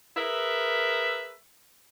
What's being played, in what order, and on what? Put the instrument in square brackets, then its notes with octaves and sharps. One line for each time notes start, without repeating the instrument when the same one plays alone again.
[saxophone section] G#4 A#4 B4 E5